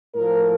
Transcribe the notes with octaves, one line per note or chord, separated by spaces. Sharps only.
A2 F3 A#4